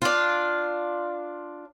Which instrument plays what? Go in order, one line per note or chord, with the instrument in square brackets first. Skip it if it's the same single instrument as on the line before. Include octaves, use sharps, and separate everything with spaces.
[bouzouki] D4 F4